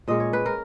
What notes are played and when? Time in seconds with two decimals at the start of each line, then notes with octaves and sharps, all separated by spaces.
0.08 A#2 G#3 C#4 D#5
0.20 C#5
0.33 B4
0.46 A#4